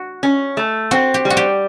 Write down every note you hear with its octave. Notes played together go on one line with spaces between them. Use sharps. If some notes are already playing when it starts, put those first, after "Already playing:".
Already playing: F#4
C#4
A3
C4 F#4
G4
G3
F#4
G4